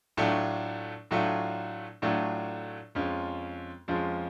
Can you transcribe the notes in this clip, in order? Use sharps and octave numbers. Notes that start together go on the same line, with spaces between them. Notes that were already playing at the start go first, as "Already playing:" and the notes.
A2 F#3 A3 D4 F4
A2 F#3 A3 D4 F4
A2 F#3 A3 D4 F4
F2 F3 G#3 C#4 F4
F2 F3 G#3 C#4 F4